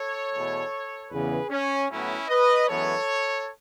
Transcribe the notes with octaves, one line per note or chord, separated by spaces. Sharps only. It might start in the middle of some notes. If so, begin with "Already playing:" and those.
Already playing: A4 C#5
E2 B2 A3
E2 C#3 E3 B3 G#4 B4
C#4
A2 F#3 B3 C#4 E4
B4 D#5
F#2 E3 G#3 B3 A4 C#5